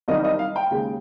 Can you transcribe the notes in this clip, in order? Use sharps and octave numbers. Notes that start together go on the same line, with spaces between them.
C2 C3 D#3 G3 D#5
D#5
F5
G5
D#2 C#3 G#3